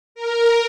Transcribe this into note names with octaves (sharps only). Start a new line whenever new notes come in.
A#4